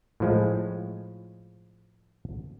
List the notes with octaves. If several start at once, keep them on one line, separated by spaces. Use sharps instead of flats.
A2 F3 G#3